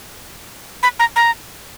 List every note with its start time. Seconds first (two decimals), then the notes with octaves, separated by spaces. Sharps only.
0.83 B5
0.99 A#5
1.16 A#5